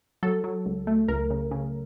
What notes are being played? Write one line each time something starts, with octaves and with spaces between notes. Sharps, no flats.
F#3 A4
F#3
C#2
A3
C#2 A#4
C#3
C#3